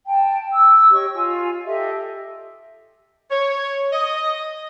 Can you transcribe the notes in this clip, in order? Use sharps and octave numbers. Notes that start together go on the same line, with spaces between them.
G5 A5
E6
G4 C#5 D#5 C#6
F4 G#5
G4 A4 D#5 E5
C#5
D#5